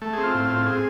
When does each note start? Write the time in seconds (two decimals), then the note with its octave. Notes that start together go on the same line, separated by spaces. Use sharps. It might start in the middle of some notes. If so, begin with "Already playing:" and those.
0.02 A3
0.13 G#4
0.18 C4
0.23 F4
0.34 A2
0.45 C4 F4
0.66 C4 G#4